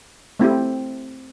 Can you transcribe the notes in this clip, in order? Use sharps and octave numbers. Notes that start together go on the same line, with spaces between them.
A3 C4 E4 G4